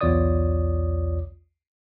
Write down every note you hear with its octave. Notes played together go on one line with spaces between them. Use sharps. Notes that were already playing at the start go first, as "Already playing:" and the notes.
B1 E2 F4 C#5 D5 D#6